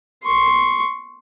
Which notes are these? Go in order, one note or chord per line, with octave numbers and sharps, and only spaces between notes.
C6 C#6